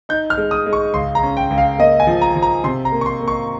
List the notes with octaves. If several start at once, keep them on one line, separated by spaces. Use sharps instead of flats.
D#4 G6
F6
G#3
D#6
G#3
C#6
C#2 C6
A#5
C#4
G5
C#2
F5
A#3 D#5
G#5
F3
A#5
F3
A#5
C3 C6
A#5
A#3
C#6
C6
A#3
C#6